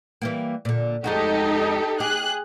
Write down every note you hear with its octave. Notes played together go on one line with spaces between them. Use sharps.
E3 G3 A#3
A#2 D3
F2 G#3 D#4 F#4 G4 A4
G4 G#4 F#6